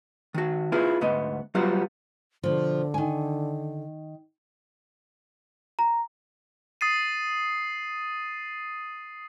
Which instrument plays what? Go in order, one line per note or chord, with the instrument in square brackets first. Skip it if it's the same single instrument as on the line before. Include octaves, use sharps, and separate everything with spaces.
[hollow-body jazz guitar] D#3 F#4
B3 E4 F4 G#4 B4
D2 G#2 B3 D#5
F#3 G3 B3 F4 F#4
[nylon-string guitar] B2 F3 [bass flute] D3
[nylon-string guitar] D#3 G#5
[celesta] A#5
[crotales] D#6 A6 C7 D#7